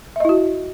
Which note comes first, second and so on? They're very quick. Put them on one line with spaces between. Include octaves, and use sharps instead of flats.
E5 D#5 E4 F#4